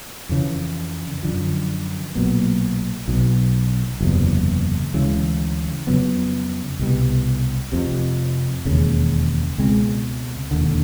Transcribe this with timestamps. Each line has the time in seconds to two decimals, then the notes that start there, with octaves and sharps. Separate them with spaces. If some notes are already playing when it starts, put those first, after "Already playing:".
0.29 F2 C#3 E3
1.23 F#2 D3 F3
2.15 B1 A#2 F#3 B3
3.08 B1 B2 F#3
4.01 F#1 E2 C3
4.94 D2 C#3 E3 G#3
5.87 F2 C#3 F#3 B3
6.79 C2 B2 G3
7.72 F1 F2 C3
8.65 E1 D#2 C#3
9.58 C#2 B2 G#3 C4
10.51 E1 D#2 D3